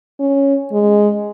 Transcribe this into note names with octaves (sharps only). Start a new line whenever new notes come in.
C#4
G#3